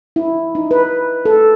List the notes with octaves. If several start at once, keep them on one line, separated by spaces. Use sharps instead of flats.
E4
D#4
B4
A4